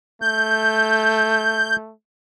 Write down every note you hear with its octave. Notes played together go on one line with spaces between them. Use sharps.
A3 G6